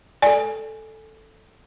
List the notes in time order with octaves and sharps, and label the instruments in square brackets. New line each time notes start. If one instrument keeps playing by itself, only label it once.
[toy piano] A4 G#5 [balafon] D5